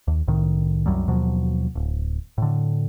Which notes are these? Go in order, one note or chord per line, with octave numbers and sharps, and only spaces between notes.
D#2
C2 A2 D#3
C2 F#2 F#3 G3
D#2 B2 F3 F#3
D1
A2 D3